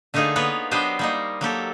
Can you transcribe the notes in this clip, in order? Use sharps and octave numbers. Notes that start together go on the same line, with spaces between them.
D3 A3 A#3 D#4 F4 G#4
A#3 B3 F4 B4 C#5
F#3 B3 D4 G4 C5 D#5
G3 A#3 D#4
F#3 A#3 G4 A4